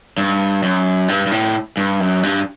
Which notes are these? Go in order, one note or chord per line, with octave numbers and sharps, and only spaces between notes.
G2
F#2
G2
G2
A2
G2
F#2
G2